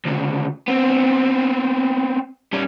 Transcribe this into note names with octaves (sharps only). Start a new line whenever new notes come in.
D2 C#3
B3 C4
G3 C#4